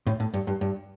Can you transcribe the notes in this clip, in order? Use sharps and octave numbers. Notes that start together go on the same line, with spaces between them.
A2
A2
G2
G2
G2